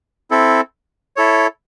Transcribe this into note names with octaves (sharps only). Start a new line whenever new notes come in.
C4 E4 A4
E4 A4 C#5